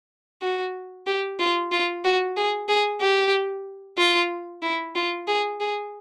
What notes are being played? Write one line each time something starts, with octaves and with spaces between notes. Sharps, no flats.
F#4
G4
F4
F4
F#4
G#4
G#4
G4
F4
E4
F4
G#4
G#4